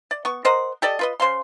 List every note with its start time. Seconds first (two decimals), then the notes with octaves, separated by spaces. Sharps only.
0.11 D5
0.25 B3 C#6
0.45 A#4 C5 D#5 F#5
0.82 G4 A4 D5 D#5
0.99 F4 B4 D#5
1.20 C#3 C5 F5 C6